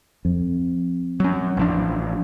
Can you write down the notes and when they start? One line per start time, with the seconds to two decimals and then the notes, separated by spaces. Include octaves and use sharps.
0.25 F2
1.20 F#3 C#4
1.57 A1 F3 D4